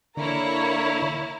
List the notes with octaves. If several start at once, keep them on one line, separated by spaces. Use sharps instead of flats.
D3 A#3 E4 C#5 A#5